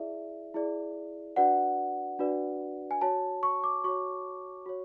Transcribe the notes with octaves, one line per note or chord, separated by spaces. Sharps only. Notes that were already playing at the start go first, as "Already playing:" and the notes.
Already playing: E4 G#4 D5 E5
E4 G#4 D5
D4 F#4 B4 D5 F#5
D4 F#4 B4 D5
G#5
F#4 C#5 A5
C#6
D6
F#4 C#5 C#6
F#4 C#5